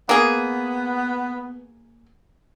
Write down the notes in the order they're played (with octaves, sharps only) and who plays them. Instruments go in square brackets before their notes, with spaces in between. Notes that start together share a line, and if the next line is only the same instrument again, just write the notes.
[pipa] A#3 G#4 [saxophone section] B3